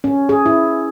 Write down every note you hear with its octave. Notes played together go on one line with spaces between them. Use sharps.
C#4
G#4
E4